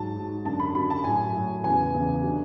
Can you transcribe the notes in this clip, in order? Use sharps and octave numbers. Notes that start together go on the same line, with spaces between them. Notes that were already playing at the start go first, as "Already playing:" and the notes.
Already playing: G#2 F#3 A5
G#2 F#3
F#2 D3 F#3 A5
B5
F#2 D3 F#3 B5
A5
A2 F#3 G#5
A2 F#3
E2 C#3 E3 G#5
E2 C#3 E3
D3 F#3